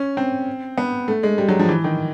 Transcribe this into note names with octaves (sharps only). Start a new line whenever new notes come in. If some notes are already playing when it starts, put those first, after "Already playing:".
Already playing: C#4
C4
B3
A3
G#3
G3
F#3
F3
E3
D#3